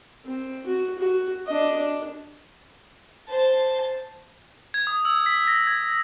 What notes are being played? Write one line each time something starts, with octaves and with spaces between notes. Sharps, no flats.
C4
F#4
F#4
D4 D#5
D4
C5 A5
G#6
D#6
E6
B6
A#6
G#6